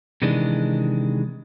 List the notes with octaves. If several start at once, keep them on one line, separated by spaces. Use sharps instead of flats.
C3 D#3 E3 G#3 D4